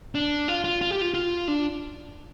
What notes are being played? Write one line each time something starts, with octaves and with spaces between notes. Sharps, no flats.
D4
F4
F4
F4
G4
F4
F4
D4